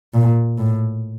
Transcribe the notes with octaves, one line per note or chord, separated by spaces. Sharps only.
A#2
A2